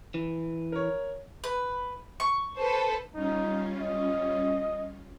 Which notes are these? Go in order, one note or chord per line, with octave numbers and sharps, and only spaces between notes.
E3
A#4 C#5
B4
C#6
A4 B4 C5
G3 C#4 D#4 F4
D#5